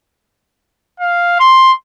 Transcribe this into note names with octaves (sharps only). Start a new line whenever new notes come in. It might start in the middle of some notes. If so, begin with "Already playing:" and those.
F5
C6